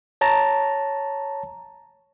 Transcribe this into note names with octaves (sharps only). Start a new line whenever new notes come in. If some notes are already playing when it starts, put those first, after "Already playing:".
C#5 A5 A#5